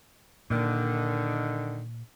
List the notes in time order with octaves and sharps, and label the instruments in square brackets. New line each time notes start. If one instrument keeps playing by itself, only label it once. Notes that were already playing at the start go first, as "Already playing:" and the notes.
[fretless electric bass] A#2 A#3 [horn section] D3 D#3